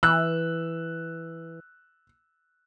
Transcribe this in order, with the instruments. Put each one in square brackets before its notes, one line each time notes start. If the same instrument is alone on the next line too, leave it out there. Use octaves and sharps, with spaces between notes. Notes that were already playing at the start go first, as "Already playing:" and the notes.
[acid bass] E3 [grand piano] E6 F#6